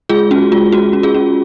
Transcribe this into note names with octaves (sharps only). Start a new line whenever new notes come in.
G#3 F4 G#4
C#4 F#4
G#3 F4
C#4 F#4
C#4
F4 G#4
C#4